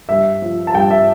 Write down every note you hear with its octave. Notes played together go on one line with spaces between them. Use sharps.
G2 E5
F3
A5
G2 G5
E5